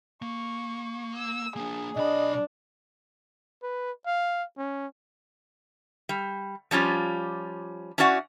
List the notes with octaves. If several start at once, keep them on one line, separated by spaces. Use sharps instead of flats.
A#3 C#6
E6
A#3 D4 G#4
B1 D4 D#5 B5
B4
F5
C#4
G3
F3 G3 C#4 F4
C#4 D4 E4 F#4 D5 F#5